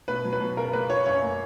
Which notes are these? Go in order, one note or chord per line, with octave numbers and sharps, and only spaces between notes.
B2 B4
F#3
B4
B2
C#3 A#4
A#3 B4
C#3 C#5
F#2 C#5
A#3